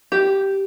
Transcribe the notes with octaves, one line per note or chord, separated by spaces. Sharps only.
G4